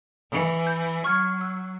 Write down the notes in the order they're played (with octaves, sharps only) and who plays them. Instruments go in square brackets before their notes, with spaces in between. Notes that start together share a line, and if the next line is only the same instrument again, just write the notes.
[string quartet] E3
[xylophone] G6
[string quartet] F#3 [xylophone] C#6 F6 G#6
[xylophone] E6 F#6